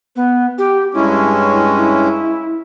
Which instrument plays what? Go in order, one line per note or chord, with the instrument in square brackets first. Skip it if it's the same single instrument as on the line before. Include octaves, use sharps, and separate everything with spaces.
[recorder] B3
G4
[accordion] G2 G#3 C#4 [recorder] E4
[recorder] E4